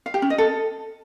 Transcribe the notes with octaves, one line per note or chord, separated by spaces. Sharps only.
F5
G4
C#4
D#5
A4